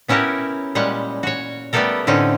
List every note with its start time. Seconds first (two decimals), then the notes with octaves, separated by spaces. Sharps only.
0.08 B3 C#4 E4 F#4 G4 A#4
0.75 A#2 G3 G#3 C#4 F#5
1.23 F#4 C#5
1.73 G3 A3 B3 G4 A4 A#4
2.07 A2 D3 C4 C#4 D#4